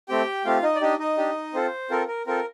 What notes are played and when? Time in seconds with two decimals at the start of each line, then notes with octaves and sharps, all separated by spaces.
0.09 A3 C4 G4 G5
0.45 A3 C4 F4 G4 F5
0.63 D#4 D#5
0.75 D5
0.81 D4 D#4 G4 D#5
0.99 D#4 D#5
1.17 D4 G4
1.54 C4 F4 A4 C5
1.90 C4 F4 A4 A#4
2.08 A#4
2.26 C4 F4 A4 A#4